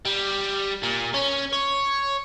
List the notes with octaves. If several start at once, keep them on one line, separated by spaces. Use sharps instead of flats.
G3
A#2
C#4
C#5